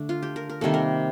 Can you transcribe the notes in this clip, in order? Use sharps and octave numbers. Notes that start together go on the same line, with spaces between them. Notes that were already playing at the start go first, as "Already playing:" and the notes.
Already playing: D3 A3 D4
F4
G4
A#4
A#4
C3 D#3 G3 A#3 A4
A#4